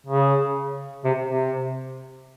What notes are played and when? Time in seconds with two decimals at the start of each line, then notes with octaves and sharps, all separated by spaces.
0.07 C#3
1.04 C3
1.29 C3